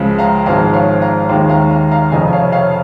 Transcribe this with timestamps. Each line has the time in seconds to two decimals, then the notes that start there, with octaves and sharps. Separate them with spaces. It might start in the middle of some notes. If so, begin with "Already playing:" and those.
Already playing: C#2 C#3 F3 G#3
0.19 F5 A#5
0.46 G#1 G#2 F3 G#3 F5 A#5
0.74 C#5 F5
1.02 F5 A#5
1.29 D#2 D#3 G#3 F5 A#5
1.49 F5 A#5
1.70 F5 A#5
1.91 F5 A#5
2.11 F1 F2 C#3 F3 D#5 G#5
2.33 C#5 F5
2.52 C#5 F5